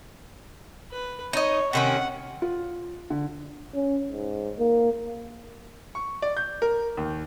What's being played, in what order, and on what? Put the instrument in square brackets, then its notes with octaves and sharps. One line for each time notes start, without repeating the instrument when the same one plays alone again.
[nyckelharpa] B4
[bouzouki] D#4 D#5 [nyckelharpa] C#5
[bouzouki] C3 D#3 C#4 [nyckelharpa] F#5
[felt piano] F4
D3
[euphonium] C#4
G#2
A#3
[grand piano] C#6
D5
G6
A#4
D#2